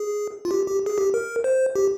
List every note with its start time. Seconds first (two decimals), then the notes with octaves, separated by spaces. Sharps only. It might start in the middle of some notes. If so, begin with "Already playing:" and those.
Already playing: G#4
0.45 F4
0.51 G4
0.67 G4
0.86 G#4
0.98 G4
1.14 A#4
1.44 C5
1.75 G4